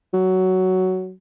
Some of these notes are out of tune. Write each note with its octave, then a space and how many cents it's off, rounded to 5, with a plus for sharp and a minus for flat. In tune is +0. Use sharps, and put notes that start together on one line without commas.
F#3 +10